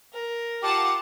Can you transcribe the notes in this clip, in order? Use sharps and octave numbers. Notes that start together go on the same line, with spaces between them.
A#4
F4 G4 F#5 A5 D6